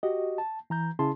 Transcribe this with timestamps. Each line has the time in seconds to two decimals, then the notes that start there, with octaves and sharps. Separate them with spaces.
0.03 F#4 G4 D#5
0.38 A5
0.70 E3 A#5 G6
0.99 C#3 C#4 E4 G#4 A5 C6